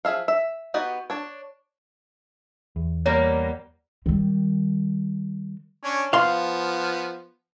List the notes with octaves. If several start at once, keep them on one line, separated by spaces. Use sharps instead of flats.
F3 G#4 E5 F5
E5
B3 D#4 F#4 G4
D4 C#5
E2
G3 A#3 B3 C#5
D#3 G3
C#4 D4 C#5
F3 B3 F5 C6